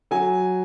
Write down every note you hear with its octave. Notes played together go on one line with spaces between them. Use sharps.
F#3 G#5